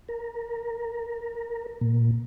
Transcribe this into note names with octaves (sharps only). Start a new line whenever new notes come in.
A#4
A#2